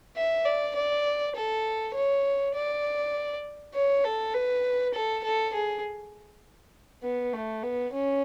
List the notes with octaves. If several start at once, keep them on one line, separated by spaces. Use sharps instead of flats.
E5
D5
D5
A4
C#5
D5
C#5
A4
B4
A4
A4
G#4
B3
A3
B3
C#4